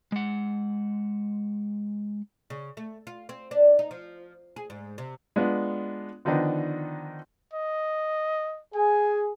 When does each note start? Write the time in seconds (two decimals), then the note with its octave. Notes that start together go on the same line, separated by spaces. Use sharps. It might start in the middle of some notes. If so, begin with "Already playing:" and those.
0.12 G#3 F#5
2.50 C#3
2.77 A3
3.07 F4
3.29 C4
3.51 D4
3.79 D#4
3.91 F3
4.56 G#4
4.70 G#2
4.98 C3
5.36 G#3 B3 D4 F4
6.25 D3 D#3 F3 B3 D4 D#4
7.54 D#5
8.75 G#4 G#5